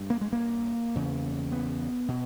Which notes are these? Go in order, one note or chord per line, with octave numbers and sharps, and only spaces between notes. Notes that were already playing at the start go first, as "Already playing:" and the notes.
Already playing: G2
A#3
G#3
A#3
E2 C#3
B3
B2